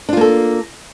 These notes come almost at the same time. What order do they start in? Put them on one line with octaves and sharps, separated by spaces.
D4 F4 A#3 A4